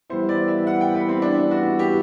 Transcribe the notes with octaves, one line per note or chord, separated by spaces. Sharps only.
E3 G3 B3 E4 C5
D5
E5
F#5
G5
B4
C4
D4
F#4
G4